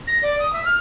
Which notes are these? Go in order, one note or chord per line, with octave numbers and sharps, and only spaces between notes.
A#6
D5
D#6
E5
F6